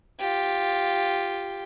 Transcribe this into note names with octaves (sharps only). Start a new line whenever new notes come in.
F4 G4